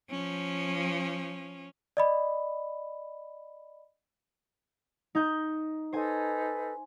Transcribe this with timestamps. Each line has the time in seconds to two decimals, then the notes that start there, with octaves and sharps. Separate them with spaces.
0.10 F3 C#4
1.97 D5 D#5 B5
5.15 D#4 G6
5.93 D#4 A4 B4 C5 G#5